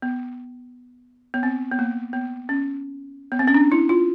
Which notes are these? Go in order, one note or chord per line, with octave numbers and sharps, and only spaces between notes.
B3
B3
C4
B3
A#3
B3
C#4
B3
C4
C#4
D4
E4
F4